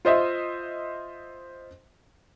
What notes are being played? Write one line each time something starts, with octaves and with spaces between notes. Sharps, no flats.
F4 C5 D#5 E5